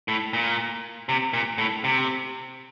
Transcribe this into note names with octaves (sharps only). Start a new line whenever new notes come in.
A2
A#2
C3
A#2
A2
C3